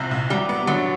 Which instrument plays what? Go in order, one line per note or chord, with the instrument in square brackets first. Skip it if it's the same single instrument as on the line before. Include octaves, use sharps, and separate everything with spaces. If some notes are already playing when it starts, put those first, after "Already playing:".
Already playing: [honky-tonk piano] F#1 C2 C3 F3
C2
[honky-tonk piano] F#3 [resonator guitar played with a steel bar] G3
[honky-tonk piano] B3
[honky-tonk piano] D3 [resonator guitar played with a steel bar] F#3